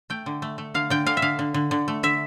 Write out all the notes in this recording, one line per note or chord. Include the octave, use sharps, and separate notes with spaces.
A3 G5
D3
A3
A3
D3 F5
D3 G5
D3 F5
E5
D3 F5
D3
D3
D3
A3
D3 E5